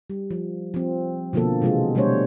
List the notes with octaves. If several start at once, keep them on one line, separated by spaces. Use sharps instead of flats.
G3
F3
F3 C4
B2 D3 F3 A#3 A4
C3 E3 G#3 B3 F4
B2 G3 A3 D4 C5 C#5